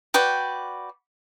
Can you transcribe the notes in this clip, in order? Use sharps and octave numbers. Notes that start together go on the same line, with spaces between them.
F#4 B4 D5 G5